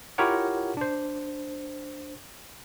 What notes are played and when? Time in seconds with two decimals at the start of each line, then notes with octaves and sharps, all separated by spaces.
0.18 E4 F4 G4 A#4 C#5 F#5
0.77 D4 C5